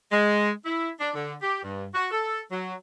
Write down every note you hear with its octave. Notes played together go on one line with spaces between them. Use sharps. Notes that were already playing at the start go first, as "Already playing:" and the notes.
G#3
E4
D4
D3
G4
G2
F#4
A4
F#3